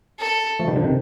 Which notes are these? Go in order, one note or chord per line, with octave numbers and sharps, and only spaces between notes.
A4
F3 A3
D#3 G3
D3 F3
C3 D#3